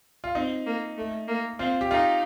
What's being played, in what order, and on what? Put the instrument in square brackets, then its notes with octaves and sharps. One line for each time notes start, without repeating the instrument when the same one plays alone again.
[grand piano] F4
[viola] C4 [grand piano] D#4
[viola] A#3
A3
A#3
[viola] C4 [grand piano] F4
[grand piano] G4
[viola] D#4 [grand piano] F4